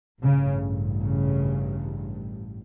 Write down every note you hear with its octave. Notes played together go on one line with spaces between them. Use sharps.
A1 G2 C#3
C#3